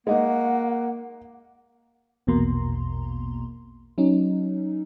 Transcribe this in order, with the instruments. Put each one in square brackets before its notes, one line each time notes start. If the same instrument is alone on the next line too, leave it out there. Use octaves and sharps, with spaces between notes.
[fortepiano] G#3 D#4 [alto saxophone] A#3 [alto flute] F#5
[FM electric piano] A#1 E2 B2 A#3 A#5 C6
F#3 C#4 D#4